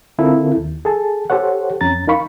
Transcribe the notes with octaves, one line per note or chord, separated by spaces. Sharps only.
D3 C4 E4 F4 A4 A#4
D#2
G#4 A4 A5
G4 A4 C5 C#5 F#5
F2 C#4 A#5 A6
D#4 A#4 F5 B5 C#6